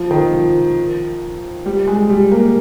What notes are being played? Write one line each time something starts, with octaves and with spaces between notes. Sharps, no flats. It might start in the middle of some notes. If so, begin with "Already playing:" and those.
Already playing: F3
D#3
F3
G3
G#3
G3
A#3